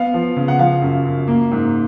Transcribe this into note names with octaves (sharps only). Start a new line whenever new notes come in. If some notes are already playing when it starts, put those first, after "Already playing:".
Already playing: B3 F5
F3
C#3
F#5
F3 F5
F#2
F#2
A#3
G#2